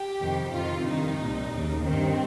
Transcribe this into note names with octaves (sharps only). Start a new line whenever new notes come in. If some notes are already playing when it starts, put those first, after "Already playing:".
Already playing: G4
F2 C3 D#3
F2 C3 D#3 F4
G2 D#3 D#4
C2 A#2
D#2 C#3
G2 D#3 C4